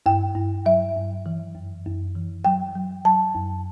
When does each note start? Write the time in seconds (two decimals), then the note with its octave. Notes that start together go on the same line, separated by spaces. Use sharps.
0.06 G2 G5
0.35 G2
0.66 F#3 E5
0.96 G2
1.26 E3
1.55 F#2
1.86 F#2
2.15 E3
2.45 F#3 G5
2.75 F#3
3.05 F#3 A5
3.35 F#2